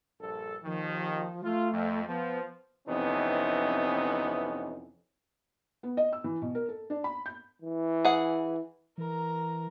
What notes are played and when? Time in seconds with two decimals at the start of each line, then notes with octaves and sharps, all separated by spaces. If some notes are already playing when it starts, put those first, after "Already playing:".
0.20 A#1 G2 A4
0.64 D#2 D#3 F3
1.44 A3 F4
1.73 F2
2.07 F3 B3
2.88 F2 C3 E3 B3 C#4 D#4
5.83 B3
5.97 D#5
6.13 E6
6.24 E3
6.42 B2
6.55 A#4
6.69 A4
6.90 D4
7.04 B5
7.26 G6
7.62 E3
8.05 G#4 F#5
8.98 E3 A#4 A#5